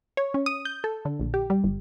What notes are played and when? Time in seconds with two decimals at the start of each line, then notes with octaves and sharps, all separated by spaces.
0.17 C#5
0.34 C#4
0.46 D#6
0.65 G6
0.84 A4
1.05 D3
1.20 A#1
1.34 G4
1.50 G3
1.64 G1